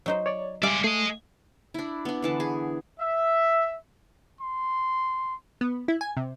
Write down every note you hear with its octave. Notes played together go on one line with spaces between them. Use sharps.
F#3 D#4 C5
C#5 D5
G3 G#3 D5 E5 F5 G#5
A3 G#4 D#5
D4 E4
B3 D4
D3 E3 A5
G#4
E5
C6
B3
E4
G#5
C3